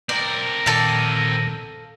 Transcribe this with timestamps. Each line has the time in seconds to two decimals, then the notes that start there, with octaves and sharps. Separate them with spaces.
0.09 C4 A#4 D5
0.66 A#2 D#3 A4 D5 F5